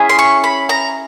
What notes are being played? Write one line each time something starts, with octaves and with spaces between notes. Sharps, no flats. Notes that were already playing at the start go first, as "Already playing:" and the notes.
Already playing: C#4 E4 G#4
C6
C#6
B5
A#5